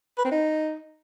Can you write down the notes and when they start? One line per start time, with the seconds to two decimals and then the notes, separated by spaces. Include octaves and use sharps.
0.18 B4
0.25 C4
0.31 D#4